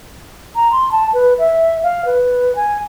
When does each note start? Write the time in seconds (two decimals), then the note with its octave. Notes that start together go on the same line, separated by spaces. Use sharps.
0.56 A#5
0.72 C6
0.92 A5
1.14 B4
1.39 E5
1.83 F5
2.05 B4
2.56 G#5